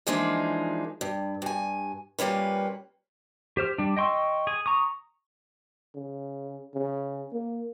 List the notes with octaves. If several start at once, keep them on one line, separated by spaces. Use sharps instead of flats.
E3 F3 G#3 A#3 D4 D#4
G2
G2 G#5
A#2 G3 A#3 C#4 B4
G4 C5 F6
G3 D4
D#5 G5 C6 C#6 E6
G#4
A#5 C#6 D#6
C#3
C#3
A#3